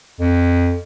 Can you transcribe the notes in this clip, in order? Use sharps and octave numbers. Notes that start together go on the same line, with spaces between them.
F2